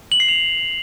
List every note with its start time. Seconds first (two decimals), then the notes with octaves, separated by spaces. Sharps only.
0.12 F#7
0.20 C7
0.29 F7